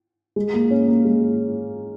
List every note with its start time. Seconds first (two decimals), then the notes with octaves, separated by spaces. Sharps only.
0.36 G#3
0.54 A#3
0.71 C#4
0.88 A#3
1.04 G#3